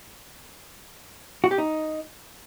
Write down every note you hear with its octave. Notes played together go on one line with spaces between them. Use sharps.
F#4
G4
D#4